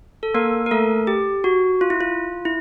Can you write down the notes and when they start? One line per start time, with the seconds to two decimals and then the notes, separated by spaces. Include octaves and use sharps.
0.23 A4
0.34 A#3 A#4
0.66 A#4
0.71 A3 A4
1.07 G4
1.44 F#4
1.81 F4
1.90 E4
2.01 F4
2.45 E4